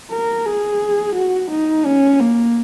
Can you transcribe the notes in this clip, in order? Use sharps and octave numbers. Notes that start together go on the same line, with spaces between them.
A#4
G#4
F#4
D#4
C#4
A#3